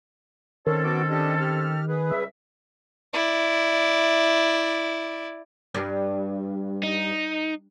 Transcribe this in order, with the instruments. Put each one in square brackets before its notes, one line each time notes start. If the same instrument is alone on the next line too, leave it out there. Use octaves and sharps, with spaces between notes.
[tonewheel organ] D#3 [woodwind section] C4 C#4 A4 [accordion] C#5
[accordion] B3 F#4 D6
D4 G4 D#5
G4 F6
B3 G#4 B4
[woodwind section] C#2 G3 E5
[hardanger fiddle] E4 D5
[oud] G2
[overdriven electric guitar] D#4